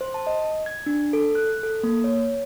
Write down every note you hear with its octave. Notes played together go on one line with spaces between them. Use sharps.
C5
A5
D#5
G#6
D4
A4
F#6
A4
A#3
C#5